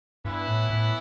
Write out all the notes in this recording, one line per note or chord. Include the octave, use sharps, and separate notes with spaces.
G2 E3 B3 E4
A2
A2